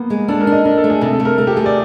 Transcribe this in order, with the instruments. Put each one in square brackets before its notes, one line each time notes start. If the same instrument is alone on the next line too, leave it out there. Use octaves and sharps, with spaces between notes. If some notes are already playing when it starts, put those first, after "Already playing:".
Already playing: [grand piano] A#3 B3
[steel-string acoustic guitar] G#3
[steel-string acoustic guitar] D4 [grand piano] A4
[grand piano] A#4
[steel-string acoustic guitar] D4
[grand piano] D#5
[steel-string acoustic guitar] D4 [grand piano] A#4
[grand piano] A4
[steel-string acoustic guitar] A3
[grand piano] G#4
[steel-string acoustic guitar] C3 [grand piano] A4
[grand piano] A4
[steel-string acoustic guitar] A3
[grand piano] A#4
[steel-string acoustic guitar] A3 [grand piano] A4
[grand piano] G4
[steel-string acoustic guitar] A3 [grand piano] G#4
[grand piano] D5